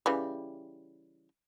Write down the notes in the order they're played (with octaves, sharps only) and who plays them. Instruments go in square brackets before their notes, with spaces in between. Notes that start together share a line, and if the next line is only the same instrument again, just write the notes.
[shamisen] C#3 E3 G3